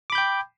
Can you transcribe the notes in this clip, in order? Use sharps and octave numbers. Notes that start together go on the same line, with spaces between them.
G5 B5 D6 G6